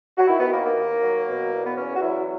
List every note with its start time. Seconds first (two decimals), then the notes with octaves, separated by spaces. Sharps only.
0.18 F#4
0.27 D#3 E4
0.40 B3
0.52 D#2 A#3
0.65 A#3
0.77 D#2
1.02 F#3
1.27 B2
1.52 E2
1.66 B3
1.77 E2 C#4
1.96 F#4
2.02 F#3 E4